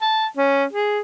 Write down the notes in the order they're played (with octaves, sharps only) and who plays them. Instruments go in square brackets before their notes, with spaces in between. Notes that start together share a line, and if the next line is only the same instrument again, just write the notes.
[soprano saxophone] A5
C#4
G#4